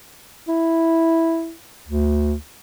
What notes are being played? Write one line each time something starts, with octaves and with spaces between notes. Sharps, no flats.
E4
D2